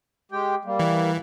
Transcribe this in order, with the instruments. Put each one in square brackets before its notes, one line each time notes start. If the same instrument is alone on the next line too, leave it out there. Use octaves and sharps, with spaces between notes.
[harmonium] G#3 G4 G5
G3 A#3
[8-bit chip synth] E3